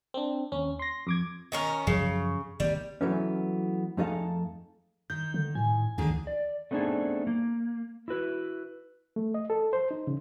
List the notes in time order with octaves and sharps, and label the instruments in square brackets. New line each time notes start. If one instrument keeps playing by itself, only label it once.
[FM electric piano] C4 D4
D#2 C#4
C6 A#6
F2 D6 G#6
[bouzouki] D#3 C#4 A#4
[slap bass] F#2 F3 F#3 [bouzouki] C#3
[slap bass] D#3 A#3 C4 [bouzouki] G3
[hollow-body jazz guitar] E3 F#3 A3 B3 C#4
F2 A3 D#4 G#4 A4 F5
[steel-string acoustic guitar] D#3 [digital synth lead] G6
[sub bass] D3
[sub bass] A2 [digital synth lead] G#5
[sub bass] D2 [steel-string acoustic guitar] D3 D#3 G#4
[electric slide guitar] D5
A3 B3 C4 D4 D#4 G#4
A#3
E4 F#4 B4
[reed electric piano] A3
D#5
A4
C5
D#4
C#3